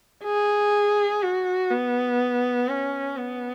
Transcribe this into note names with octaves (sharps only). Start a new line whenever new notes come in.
G#4
F#4
B3
C#4
B3